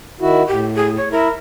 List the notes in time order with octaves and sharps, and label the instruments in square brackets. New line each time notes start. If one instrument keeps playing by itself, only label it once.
[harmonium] D#3 E4 F#4
[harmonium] A2 [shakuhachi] G4
[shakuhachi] G#4
C#5
[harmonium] E4 [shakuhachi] A#4